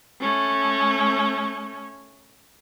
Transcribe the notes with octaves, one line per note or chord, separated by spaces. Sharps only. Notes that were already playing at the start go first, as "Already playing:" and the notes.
A3 C#4